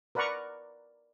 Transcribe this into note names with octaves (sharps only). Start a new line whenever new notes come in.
A#4 B4 D5 F#5 A#5 C#6